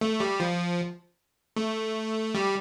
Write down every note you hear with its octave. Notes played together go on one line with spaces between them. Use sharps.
A3
G3
F3
A3
G3